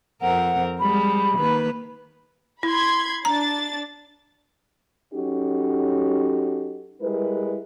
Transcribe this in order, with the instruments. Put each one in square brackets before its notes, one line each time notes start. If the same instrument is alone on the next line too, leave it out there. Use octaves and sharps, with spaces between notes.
[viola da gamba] F2 C4 A#4 [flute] F#5
[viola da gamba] G3 G#3 [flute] B5
[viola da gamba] D#3 A#3 B4
[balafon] E4 [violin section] B5 C6 G#6
[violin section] D4 A6 [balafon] A#5
[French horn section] F#3 C#4 D#4 F#4 G4 A4
G3 G#3 E4 A#4 B4